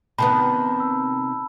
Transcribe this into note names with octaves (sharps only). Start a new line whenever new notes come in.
C3 D#3 B3 A5 B5
E6